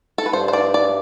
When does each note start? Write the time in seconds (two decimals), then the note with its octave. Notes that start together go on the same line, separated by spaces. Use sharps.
0.18 A4
0.26 B4
0.33 G2 C5
0.48 C5
0.53 D5
0.74 D5